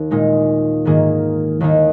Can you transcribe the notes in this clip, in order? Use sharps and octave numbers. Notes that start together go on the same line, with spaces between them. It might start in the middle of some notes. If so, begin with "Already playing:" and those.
Already playing: D#2 D#3
A#2 G#3 D#4
G#2 D#3 A#3 G#4
D#2 D#3 A#3 D#4